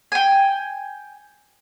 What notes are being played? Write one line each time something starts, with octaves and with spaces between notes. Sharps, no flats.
G5 G#5